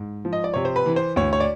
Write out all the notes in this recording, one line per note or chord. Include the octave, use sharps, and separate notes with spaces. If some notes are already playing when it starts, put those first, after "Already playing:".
Already playing: G#2
F3
D#5
D5
C3 C#5
C5
B4
E3
C5
D2 C#5
C#5
D5